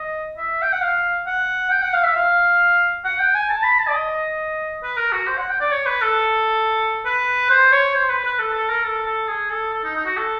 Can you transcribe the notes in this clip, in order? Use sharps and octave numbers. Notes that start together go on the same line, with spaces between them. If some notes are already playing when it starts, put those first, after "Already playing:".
Already playing: D#5
E5
G5
F#5
F5
F#5
G5
F#5
F5
E5
F5
F#5
G5
G#5
A5
B5
A5
D5
D#5
B4
A#4
F#4
C5
F#5
G5
D5
C#5
B4
A4
B4
C5
C#5
C5
B4
B4
A4
A4
A#4
A4
A4
G#4
A4
A4
D#4
D#4
F#4
A4